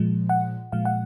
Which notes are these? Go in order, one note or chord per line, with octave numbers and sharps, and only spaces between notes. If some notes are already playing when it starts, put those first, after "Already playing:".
Already playing: A#2 F3 G#3
F#5
A#2 F3 G#3 F5
F#5